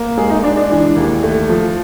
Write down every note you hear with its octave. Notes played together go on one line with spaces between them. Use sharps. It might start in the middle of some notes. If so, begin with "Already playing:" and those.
Already playing: A#3
G#3 G#4
D#4
G#3 D4
D4
E3
D#2
A3
F3